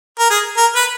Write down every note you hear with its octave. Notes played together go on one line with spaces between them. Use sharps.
A#4
G#4
A#4
B4